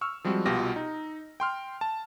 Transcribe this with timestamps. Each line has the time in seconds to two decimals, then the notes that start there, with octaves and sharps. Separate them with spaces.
0.01 C#6 E6 F6
0.24 F3 G3 G#3 C4 F#4
0.46 C2 B2 F4 G4 A#6
0.76 D#4
1.40 G5 C6 F6
1.81 A5